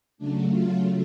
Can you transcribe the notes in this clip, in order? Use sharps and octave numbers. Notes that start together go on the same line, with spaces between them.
C#3 F#3 A3 D4
F4